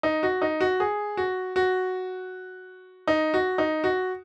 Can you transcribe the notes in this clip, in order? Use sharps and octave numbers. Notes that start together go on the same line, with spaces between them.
D#4
F#4
D#4
F#4
G#4
F#4
F#4
D#4
F#4
D#4
F#4